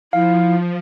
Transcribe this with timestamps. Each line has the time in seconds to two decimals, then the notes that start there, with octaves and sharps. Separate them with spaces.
0.13 F3 E4 F5